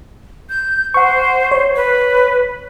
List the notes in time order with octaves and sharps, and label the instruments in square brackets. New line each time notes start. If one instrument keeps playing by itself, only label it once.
[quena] G6
[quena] C5 [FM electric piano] F#5 C#6
[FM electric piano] C#5
[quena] B4